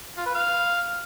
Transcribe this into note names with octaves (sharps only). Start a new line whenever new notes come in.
F4
B4
F5